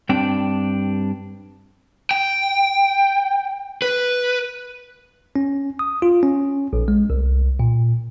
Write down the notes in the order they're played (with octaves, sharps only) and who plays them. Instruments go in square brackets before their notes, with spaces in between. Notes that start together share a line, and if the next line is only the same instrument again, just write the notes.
[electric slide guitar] G2 C4 D4 G5
[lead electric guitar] G5
B4
[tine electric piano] C#4
D#6
F4
C#4
A#1
G#3
C2
A#2